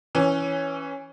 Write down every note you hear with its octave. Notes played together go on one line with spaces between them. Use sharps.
E3 C#4